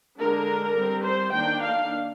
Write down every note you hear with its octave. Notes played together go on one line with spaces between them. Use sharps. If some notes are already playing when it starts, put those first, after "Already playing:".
D3 G#3 D4 A#4
G3 C4
C5
D#3 A#3 D4 G5
F5